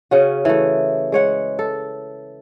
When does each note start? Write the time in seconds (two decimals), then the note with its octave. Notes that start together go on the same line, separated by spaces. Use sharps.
0.11 C#3 C#4 F#4
0.45 E3 A3
1.12 G#3 C#5 F#5
1.59 A4